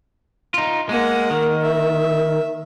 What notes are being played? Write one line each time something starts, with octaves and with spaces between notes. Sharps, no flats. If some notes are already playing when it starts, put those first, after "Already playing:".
D#4 F4
G#3 A#3 F#5
D#3
E5